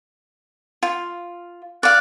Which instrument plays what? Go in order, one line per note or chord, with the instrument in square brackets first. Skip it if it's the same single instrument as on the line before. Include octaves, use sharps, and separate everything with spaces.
[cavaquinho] F4
[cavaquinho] D5 F5 [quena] F#6